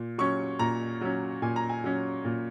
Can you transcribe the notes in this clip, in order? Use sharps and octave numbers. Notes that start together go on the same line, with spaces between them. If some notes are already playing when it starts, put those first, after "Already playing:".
Already playing: A#2
F#3 C#4 C#6
A#2 A#5
F#3 C#4
A#2 G#5
A#5
G#5
F#3 C#4
A#2